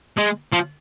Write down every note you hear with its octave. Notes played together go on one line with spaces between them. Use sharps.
G#3
F3